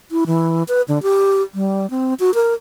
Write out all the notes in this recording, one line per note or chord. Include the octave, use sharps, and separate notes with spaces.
E4
E3
B4
D3
G4
G3
C4
F#4
A#4